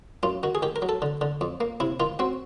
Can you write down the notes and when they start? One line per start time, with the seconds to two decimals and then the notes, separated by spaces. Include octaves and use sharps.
0.23 F#2 F4
0.43 D#3 F#4
0.55 G#4
0.62 D#3 G4
0.76 A#4
0.82 F#3
0.89 A4
1.02 D3
1.21 D3
1.41 F2
1.61 A#3
1.80 C3 E4
2.00 D#3 F4
2.19 C4 F#4